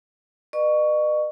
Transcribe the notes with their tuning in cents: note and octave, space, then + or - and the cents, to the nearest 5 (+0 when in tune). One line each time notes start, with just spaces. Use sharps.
B4 -25 D#5 -45 C#6 +10